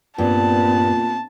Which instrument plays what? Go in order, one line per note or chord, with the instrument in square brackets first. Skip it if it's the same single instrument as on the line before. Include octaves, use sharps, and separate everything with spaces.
[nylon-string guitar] G2 [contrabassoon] A#2 [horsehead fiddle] B3 C4 [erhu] A5